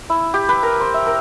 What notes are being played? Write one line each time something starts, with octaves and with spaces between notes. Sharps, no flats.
E4
G4
B4
A#4
C5
E5
A#4